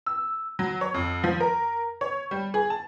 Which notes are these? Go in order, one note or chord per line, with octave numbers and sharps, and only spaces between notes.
E6
F#3
C#5
F2
F3
A#4
C#5
G3
G#4
A5